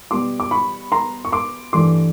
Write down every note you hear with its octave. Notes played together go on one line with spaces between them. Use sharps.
B2 G3 B3 C6 D6
D6
B5 C#6
A#5 C6
C#6
C6 D6
G2 E3 A3 C6 D6